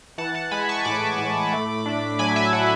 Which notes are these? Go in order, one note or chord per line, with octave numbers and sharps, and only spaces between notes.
E3 F#5 A5
F#5 A5
G#3 G#5 B5
A5 C#6
C#6
A2 B5 D6
A2
A3
D4
F#3 G#5 B5
E5 G#5
F#3 F#5